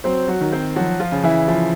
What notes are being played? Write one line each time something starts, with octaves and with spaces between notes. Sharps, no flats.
F#3 C4 C5
F#3 F#4
D#3
C4 C5
F3 F#3 F#4
F3 F4
C#3
E3 E4
F3